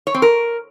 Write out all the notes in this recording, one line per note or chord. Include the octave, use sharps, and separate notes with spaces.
C#5
C4
A#4